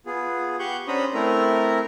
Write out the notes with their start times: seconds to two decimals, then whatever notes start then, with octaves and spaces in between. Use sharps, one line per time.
0.06 B3 F4 G#4
0.59 G4 F#5 C#6 G6
0.88 C#4 D4 C5 A#5 B5 D#6
1.14 A3 C4 E4 A#4 A#5